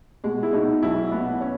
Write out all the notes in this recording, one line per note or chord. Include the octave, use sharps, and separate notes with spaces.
B2 G#3
E4
B2 D#4
B1 E4
B2 B3
C#4